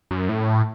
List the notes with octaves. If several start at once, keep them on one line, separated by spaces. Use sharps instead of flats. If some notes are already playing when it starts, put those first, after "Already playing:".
F#2
A2